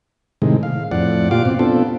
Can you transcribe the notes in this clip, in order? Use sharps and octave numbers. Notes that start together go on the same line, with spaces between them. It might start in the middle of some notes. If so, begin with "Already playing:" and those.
A2 C3 D#3 G#3
F5
F2 A2 D5 F#5
A#2 F4 G4 F5 D6
B2 C4
B3 C4 D4 F4 A4